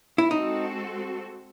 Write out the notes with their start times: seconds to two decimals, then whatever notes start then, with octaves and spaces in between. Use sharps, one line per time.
0.18 E4
0.30 G#3 C4 D#4 F#4 A4